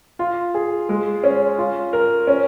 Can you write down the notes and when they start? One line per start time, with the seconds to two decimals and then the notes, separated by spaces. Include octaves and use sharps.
0.19 F4
0.54 G#4
0.89 G#3
1.23 C#4
1.58 F4
1.93 A#4
2.27 C#4